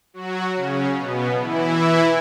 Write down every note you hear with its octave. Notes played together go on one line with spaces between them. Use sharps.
F#3 F#4
C#3 C#4
B2 B3
E3 E4